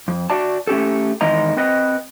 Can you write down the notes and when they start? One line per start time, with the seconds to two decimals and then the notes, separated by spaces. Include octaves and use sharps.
0.08 F2
0.30 F#4 D5 A5
0.67 A3 C#4 G4 A4
1.21 E2 D#3 G#3 D#5 A#5
1.57 C4 B4 D#5